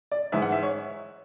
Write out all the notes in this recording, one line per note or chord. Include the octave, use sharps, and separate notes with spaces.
D5
G#2 E3 E5
F#5
E5
C#5